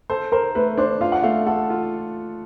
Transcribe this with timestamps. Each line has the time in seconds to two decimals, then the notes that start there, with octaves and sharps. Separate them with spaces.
0.10 A4 C5
0.32 A#4 C5
0.55 A3 B4
0.78 D4 C5
1.01 F4 F5
1.12 F#5
1.23 A3 F5
1.46 A4 F#5
1.70 F4